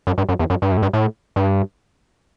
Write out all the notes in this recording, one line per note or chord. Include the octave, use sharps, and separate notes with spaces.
F#2
G2
F#2
E2
F#2
G2
F#2
A2
G2
A2
G2